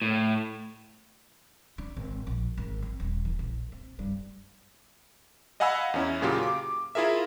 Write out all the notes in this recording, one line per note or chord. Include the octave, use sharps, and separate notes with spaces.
A2
D4
G#1
A#1
G#1
C4
D#1
E3
A#1
C4
G2
D#5 F5 F#5 G#5 B5 E6
E2 C#4 E4
A#2 C#3 F#3 F4 G4
D6
E4 F4 G#4 A#4 E5